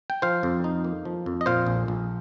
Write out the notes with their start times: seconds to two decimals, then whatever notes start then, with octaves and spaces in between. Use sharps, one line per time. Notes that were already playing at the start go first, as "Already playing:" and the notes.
0.10 G5
0.22 F3 C5 F5
0.43 F2
0.64 D#4
0.84 A#3
1.05 F3
1.26 F2
1.41 D#5
1.46 A#2 C5 F5
1.67 A#1
1.88 A#1